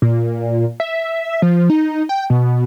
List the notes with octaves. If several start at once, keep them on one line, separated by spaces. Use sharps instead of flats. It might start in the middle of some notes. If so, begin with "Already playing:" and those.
A#2
E5
F3
D#4
G5
B2